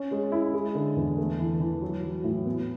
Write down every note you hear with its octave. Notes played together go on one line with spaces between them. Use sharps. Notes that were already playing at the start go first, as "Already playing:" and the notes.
Already playing: C#4
G#3
E4
G#3
D3
E2
A3
E3
E3
F#3
F#3
A2
B3